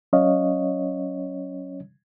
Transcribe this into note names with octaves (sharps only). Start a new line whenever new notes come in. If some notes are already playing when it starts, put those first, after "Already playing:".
F#3 C#4 C#5 D#5 F5